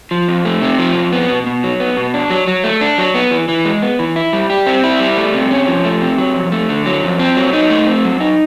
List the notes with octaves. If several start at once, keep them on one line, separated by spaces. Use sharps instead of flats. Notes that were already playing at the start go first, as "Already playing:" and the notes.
F3
F2
A3
C3
F3
F2
B3
B2
B2
F#3
B3
B2
D4
F#3
F#3
A3
D4
F#3
B3
E3
E3
G#3
B3
E3
E4
G3
G4
C4
E4
G3
A3
C3
C#4
F3
A3
C3
F#3
F2
A3
D3
F#3
F2
C4
F#3
D#4
A3
C4
F#3
D#4